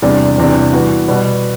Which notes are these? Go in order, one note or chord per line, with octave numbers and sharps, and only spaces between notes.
E2 C3 G3 D4
E2 C3 E3 G3 D4
E3 G3 B3 F#4
B2 G3 B3